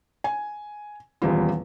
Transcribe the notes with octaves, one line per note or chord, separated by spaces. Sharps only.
G#5
D#1 E2 G3 E4 F4